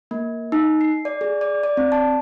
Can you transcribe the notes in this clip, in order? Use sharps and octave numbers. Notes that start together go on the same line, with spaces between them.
A#3
D#4
C7
D5
G#4
D5
D5
C4
A5